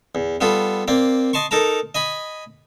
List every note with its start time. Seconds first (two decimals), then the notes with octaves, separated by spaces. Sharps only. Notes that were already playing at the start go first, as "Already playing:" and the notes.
0.15 E2
0.41 G3 B3 F4 A4
0.88 A#3 C4 D5
1.33 D#5 A5 C6 C#6
1.51 D#4 A4 A#4 A5 A#5
1.95 D#5 G#5 B5